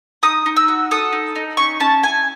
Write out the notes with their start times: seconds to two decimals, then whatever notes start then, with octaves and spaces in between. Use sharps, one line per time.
0.23 D#4 D#6
0.46 D#4
0.56 E6
0.68 F#4
0.91 A4 D#6
1.13 D#4
1.36 D#4
1.57 C#4 C#6
1.80 C#4 A5
2.03 E4 G#5